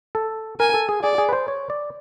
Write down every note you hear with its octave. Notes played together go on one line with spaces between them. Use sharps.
A4
A#4 G#5
A4
G#4
G#4 D5
G#4
B4
C5
C#5
D5